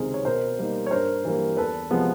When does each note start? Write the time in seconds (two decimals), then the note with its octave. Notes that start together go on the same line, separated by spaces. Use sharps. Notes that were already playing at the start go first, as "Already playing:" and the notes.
Already playing: C#2 C3 D#3 G#3 C4 G#4 A#4
0.14 C#5
0.25 B2 A#4 C5
0.59 G3 A#3 D#4
0.86 C#5
0.91 G2 A#4 C5
1.25 E3 G3 A#3
1.57 E2 A4 B4
1.90 C3 F3 G#3 B3